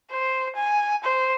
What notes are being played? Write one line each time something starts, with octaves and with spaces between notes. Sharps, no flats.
C5
G#5
C5